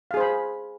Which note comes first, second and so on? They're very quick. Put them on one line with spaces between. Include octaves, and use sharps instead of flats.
F5 G#4 C5 B5